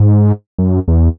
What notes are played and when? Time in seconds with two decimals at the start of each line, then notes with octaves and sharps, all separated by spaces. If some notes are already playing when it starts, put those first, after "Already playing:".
Already playing: G#2
0.59 F#2
0.88 E2